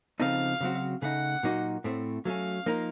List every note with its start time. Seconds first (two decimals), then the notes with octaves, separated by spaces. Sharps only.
0.20 C#3 F3 C4 D#4 A4 F5
0.61 C#3 F#3 C4 F#4
1.02 C#3 A3 D#4 F#5
1.43 A#2 F#3 A#3 D#4 F#4
1.84 A2 A3 C4
2.25 F#3 A3 C#4 F5
2.66 F3 A#3 D#4 A#4